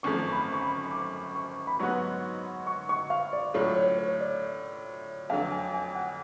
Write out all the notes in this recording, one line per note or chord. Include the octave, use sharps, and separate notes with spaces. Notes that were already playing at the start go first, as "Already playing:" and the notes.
G#1 F#2 F3 A3 C#6
B5
C#6
B5
D6
C#6
B5
G#2 F#3 B3 F#4 B4 C#6
C#6
C#6
F5
D5
A2 F#3 A3 D4 F4 C#5
C#5
C#5
D5
F2 D3 F#3 F5
G#5
G#5
F#5